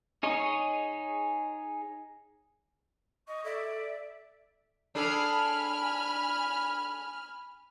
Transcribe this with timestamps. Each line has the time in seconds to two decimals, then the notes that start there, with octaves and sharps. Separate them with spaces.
0.23 D#4 G#4 C#5 D#5
3.28 D#5 C#6
3.44 A4 D5 E5
4.95 D4 G#4 A4 G#5 B5 F6